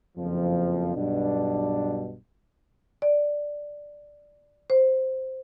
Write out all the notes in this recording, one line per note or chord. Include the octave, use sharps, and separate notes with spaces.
F#1 F2 F3
B1 G2 B2 D4
D5
C5